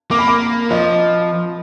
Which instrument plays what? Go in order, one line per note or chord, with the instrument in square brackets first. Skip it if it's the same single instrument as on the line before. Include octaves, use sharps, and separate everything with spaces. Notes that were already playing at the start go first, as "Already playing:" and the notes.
[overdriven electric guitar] A#3 [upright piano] D6
[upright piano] B5
D6
[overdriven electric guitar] F3 [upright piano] D#5